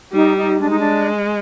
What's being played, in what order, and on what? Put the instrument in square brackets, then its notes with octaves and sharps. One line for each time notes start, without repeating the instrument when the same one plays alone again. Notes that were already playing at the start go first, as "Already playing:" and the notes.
[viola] G3 [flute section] D#4
[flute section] D#4
[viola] G#3 [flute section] D4
[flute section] D#4
D4